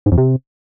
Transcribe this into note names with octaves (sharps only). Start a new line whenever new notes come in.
G#2
F2
C3